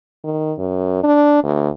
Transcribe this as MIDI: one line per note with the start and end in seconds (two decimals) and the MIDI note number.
0.24 0.53 51
0.58 0.99 42
1.04 1.40 62
1.44 1.69 38